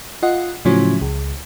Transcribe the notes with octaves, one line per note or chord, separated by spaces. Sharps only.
F4 D#5 F#5
A2 C#3 F3 F#3 C#4 E4
C#2